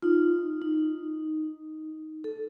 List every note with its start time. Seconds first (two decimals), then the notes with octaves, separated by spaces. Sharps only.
0.02 D#4 F4
0.62 D#4
2.24 A4